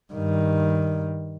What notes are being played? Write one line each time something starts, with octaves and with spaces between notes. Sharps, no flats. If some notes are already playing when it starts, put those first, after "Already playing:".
G2 D#3